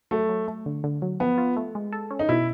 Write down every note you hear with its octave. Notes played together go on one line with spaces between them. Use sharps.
F#3 A3
F#3
A3
D3
D3
F#3
F3 B3
F4
A3
G#3
A4
C#4
D#4
B2 E4